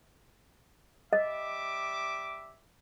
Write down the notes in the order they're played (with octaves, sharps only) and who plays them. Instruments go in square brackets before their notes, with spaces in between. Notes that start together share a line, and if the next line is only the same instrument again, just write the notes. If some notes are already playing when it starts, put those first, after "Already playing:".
[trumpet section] G3 E5 D6 [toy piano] D#5